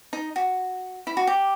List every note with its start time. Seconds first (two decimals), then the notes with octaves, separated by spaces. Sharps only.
0.13 D#4
0.36 F#4
1.07 E4
1.17 F#4
1.27 G4